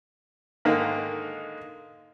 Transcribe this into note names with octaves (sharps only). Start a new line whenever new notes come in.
G#2 D3 D#3 A#3 D#4